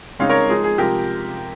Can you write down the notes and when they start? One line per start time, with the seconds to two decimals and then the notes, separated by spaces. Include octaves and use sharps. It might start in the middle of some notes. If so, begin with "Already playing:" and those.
0.19 C#3 G#3 C4 D#4 C#5 F5
0.29 A#4 C#5
0.49 F3 G#3 D#4 G#4
0.64 G#4
0.78 C3 F3 G#3 G4 A#4